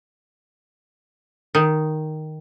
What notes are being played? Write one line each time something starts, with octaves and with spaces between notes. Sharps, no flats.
D#3